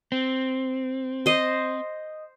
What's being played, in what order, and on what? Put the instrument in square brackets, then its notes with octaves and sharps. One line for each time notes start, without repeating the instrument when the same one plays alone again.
[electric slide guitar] C4
[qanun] C5 D#5